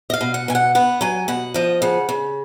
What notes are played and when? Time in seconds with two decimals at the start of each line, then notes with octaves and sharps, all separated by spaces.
0.10 D#5
0.13 F5
0.21 B2
0.34 F#5
0.48 B2 G#5
0.55 F#5
0.75 B3 F#5
1.01 F#3 G#5
1.28 B2 F#5
1.54 F3 D#5
1.82 C#3 F#5
2.09 C#3